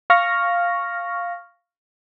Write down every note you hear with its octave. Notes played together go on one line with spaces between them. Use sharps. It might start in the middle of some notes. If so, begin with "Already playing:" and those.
F5 C#6 F6 A#6